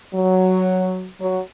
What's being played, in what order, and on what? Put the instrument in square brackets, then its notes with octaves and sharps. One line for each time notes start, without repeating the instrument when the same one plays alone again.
[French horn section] F#3
F#3